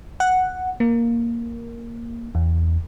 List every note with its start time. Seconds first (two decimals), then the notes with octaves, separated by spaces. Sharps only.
0.20 F#5
0.80 A#3
2.35 E2